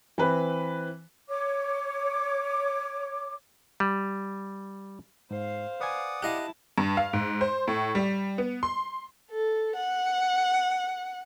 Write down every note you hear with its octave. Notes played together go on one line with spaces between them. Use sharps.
E3 C4 B4
C#5 D6
G3
G#2 C5 F5
B4 D5 F#5 G#5 D#6
E4 G4 D#5 F5 A5 F#6
G2
F5
G#2
C5
A2
G3
B3
C6
A4
F#5